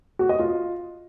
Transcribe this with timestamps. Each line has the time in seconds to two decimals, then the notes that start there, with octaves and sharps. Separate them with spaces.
0.19 F#4
0.29 D#5
0.39 F4